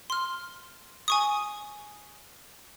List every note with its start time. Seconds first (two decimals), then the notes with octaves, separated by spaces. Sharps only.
0.10 C6 F6
1.08 G#5 C#6 D#6